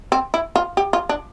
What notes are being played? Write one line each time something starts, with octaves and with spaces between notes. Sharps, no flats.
C4
E4
F4
G4
F4
D4